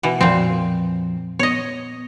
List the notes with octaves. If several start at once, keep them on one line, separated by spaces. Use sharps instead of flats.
B2 E3
F2 A#2 F3 C4
B3 C#5 D#5